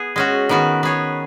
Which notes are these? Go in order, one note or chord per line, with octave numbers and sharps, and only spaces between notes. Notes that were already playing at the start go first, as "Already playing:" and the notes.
Already playing: B3 G#4
G#3 C#4 F#4
D#3 B3 F#4
B3 G#4 C#5